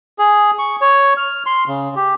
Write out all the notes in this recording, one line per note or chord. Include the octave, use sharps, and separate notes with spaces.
G#4
C#6
C#5
F6
C6
C#3
G4